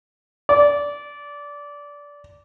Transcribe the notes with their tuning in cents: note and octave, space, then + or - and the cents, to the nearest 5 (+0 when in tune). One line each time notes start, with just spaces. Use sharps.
D5 -20